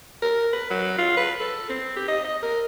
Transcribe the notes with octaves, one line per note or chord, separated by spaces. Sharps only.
A#4
B4
F#3
F4
B4
A4
C4
G4
D#5
D#5
A#4